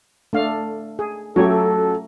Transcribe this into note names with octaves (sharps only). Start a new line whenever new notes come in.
A3 D4 F5
G#4
F#3 A3 C#4 F4 G4 A4 C#5